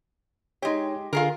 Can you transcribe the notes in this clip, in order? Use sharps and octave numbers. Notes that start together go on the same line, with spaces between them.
G#3 D#4 G4 C#5
D3 F4 G#4 A#4